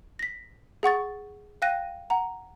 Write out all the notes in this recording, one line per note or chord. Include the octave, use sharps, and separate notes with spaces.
A#6 B6
G#4 F#5 C#6 A6
F5 G5 F#6 A#6 D#7
F#5 A#5